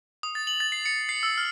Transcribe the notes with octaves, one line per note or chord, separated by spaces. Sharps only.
D#6
A6
F#7
A6
C7
C#7
C7
E6
F6